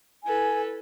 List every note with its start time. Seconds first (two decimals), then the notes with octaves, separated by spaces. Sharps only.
0.24 E4 A4 B4 G#5